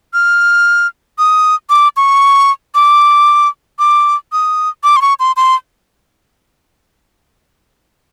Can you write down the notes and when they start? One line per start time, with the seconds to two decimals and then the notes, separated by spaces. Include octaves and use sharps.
0.14 F6
1.19 D#6
1.70 D6
1.97 C#6
2.75 D6
3.79 D6
4.33 D#6
4.84 D6
4.97 C6
5.02 C#6
5.20 C6
5.37 C6